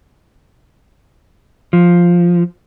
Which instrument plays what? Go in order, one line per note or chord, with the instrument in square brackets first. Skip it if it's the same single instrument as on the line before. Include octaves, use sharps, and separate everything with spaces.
[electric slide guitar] F3